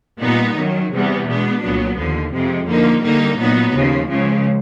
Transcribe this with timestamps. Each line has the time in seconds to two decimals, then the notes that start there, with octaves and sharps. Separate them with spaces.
0.21 A#2 G3 B3 D#4
0.56 F#2 D#3 F#3
0.92 E2 C3 E3 G3 B3
1.27 B2 G#3 B3 D4
1.62 C2 A#2 F#3 B3
1.97 D#2 D3 F3
2.32 F2 C3 F3 G#3
2.68 D3 F3 A#3 D#4
3.03 D3 G3 A#3 D#4
3.39 A#2 F#3 B3 D#4
3.73 D#2 C#3 F3
4.09 C#2 C#3 F3